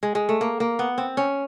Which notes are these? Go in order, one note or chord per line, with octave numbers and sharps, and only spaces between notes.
G#3
G#3
A3
A#3
A#3
B3
C4
C#4